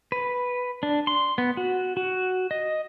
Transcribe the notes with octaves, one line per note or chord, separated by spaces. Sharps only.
B4
D4
C6
B3
F#4
F#4
D#5